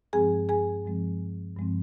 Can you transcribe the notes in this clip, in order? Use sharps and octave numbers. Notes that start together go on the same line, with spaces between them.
G2 F3 G#3 C4 G#4 G#5
G#4 G#5
G2 F3 G#3 C4
G2 F3 G#3 C4